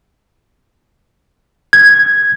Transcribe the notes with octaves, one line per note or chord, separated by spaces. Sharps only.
G#6